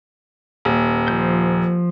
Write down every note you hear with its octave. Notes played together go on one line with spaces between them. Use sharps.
D#1
F3 G6